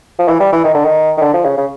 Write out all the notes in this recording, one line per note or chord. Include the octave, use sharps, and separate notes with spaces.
F3
E3
G3
E3
D#3
D3
D#3
D#3
D3
F3
C#3
C#3